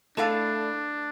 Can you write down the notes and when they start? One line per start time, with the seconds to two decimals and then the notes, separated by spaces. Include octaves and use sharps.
0.17 A3 D4 E4 A4 D5 F5